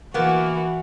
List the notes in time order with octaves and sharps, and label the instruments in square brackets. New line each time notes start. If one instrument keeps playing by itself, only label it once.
[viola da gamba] E3 F#4 [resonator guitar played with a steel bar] A#3 B3